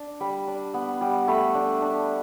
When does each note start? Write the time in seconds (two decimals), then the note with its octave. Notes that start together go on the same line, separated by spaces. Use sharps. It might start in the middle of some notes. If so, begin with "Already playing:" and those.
Already playing: D4
0.20 G3 B5
0.47 D4
0.74 B3
1.01 G3
1.28 A3 B5
1.54 D4
1.82 D4